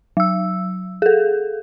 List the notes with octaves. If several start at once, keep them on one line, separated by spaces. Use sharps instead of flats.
F#3 E6
G#4 A4